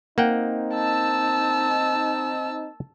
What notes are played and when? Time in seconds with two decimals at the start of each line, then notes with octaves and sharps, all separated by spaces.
0.18 A#3 C4 D#4 F#5 G5
0.74 A5 E6